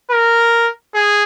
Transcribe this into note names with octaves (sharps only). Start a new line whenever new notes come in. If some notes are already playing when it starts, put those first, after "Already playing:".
A#4
G#4